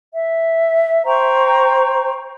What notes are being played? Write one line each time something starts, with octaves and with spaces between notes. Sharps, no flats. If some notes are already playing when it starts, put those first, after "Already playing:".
E5
C5 G5 A#5 C#6